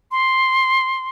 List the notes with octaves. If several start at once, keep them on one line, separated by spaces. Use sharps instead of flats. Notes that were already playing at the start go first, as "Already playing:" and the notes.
C6